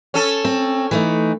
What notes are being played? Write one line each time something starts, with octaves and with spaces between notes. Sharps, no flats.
C#4 A4
C4
E3 A3 D#4